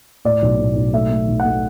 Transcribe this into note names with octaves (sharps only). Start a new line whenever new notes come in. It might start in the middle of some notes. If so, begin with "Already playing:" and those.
A2 D5
B1
A2
B1
A3 E5
A3
B1
F#5
A3